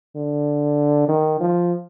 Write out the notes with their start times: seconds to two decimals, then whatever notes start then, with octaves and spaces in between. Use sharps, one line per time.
0.16 D3
1.08 D#3
1.40 F3